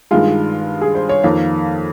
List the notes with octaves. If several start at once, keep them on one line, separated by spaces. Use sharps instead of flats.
G2 D#3 G#3 F4
G#4
C5
C#5
F2 D#3 A#3 F5